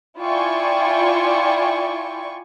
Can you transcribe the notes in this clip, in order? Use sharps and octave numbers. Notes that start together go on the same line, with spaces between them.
E4 F4 D5 G5 G#5 C#6